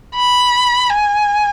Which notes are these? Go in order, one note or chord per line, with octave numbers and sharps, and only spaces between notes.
B5
G#5